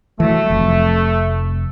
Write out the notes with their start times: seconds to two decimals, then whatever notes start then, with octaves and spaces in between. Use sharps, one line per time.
0.20 E3 F#3 A3
0.50 F1 F2